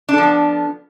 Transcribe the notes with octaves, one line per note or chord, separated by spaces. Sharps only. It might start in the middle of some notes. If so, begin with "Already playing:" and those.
F3 B3 D4 A4